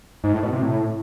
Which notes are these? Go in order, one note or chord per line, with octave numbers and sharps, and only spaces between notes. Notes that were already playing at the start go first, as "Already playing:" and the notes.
G#2
A2
B2
C3
A2